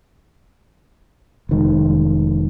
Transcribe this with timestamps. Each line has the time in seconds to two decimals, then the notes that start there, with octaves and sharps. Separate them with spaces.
1.49 F1 D#3 G#3